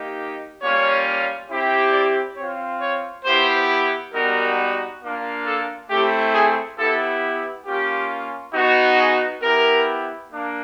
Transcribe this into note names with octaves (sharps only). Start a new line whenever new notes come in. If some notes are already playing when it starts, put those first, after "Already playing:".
Already playing: A#3 D#4 G4
G3 A#3 C#4 F4 C#5
C4 E4 G4
D5
C4 F4 C#5
C#5
B3 E4 G4 C5
G3 B3 D#4 F#4 A#4
A#3 D4 F4
A4
A3 C4 E4 G4
G#4
B3 E4 G4 A4
A#3 C#4 F4 G4
B3 D#4 F#4
G#4
B3 E4 G4 A#4
A#3 D4